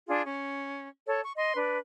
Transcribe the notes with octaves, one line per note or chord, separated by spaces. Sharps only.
D4 F4 G#4
C#4
A4 C#5
C#6
D#5 C6
D4 B4